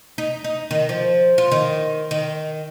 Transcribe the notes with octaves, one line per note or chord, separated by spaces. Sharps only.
D#4
D#4
D#3
F3
F4
D#3
D#3